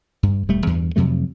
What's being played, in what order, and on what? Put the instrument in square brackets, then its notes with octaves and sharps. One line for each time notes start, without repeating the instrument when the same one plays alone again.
[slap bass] G2
E1 G3 A3
E2 G2
F2 C3 F#3 A3